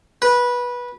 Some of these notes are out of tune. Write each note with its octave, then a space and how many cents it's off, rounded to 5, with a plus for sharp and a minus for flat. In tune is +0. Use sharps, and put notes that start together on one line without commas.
B4 -15